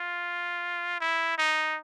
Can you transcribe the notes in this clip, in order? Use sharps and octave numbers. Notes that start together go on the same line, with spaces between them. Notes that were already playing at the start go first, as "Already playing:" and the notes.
Already playing: F4
E4
D#4